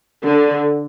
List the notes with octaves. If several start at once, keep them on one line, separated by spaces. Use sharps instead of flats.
D3